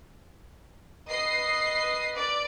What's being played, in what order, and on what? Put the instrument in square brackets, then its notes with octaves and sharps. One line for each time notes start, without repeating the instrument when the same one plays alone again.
[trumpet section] B4 [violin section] D#5 C7
[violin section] D5